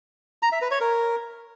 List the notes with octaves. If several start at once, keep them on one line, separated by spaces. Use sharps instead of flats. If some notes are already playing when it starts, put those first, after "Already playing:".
A#5
E5
B4
C#5
A#4